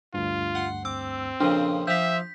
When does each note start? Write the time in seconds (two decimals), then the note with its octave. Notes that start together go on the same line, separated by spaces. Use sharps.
0.14 D2 G2 F4
0.55 F#5 C6
0.85 C4 D6 E6
1.40 F2 A#2 C#3 D4 G5 C6
1.87 F3 E5 F5 G6 B6